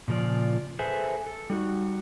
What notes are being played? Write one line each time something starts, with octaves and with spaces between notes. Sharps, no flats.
A#2 C#3 F3 F4 D5
G#4 A4 B4 C5 E5 G#5
A4
G3 D#4 F#4